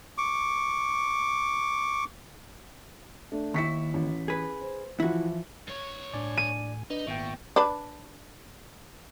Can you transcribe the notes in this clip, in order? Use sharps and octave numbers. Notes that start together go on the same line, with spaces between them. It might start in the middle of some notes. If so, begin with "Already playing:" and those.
C#6 D6
A3 D4
D#2 E4 C#6 B6 C#7
A1
G#4 B4
C5
E3 F3 E4 F#4
G2 C#5
A2 D4 D5 G#5
D#7
D4 D#4 B4
G#1 A#2 B3 E5 G5 C#6
D4 B4